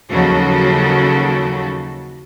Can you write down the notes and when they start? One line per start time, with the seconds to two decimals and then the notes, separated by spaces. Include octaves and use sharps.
0.11 D#2 C#3 F3 F#3 F#4 A4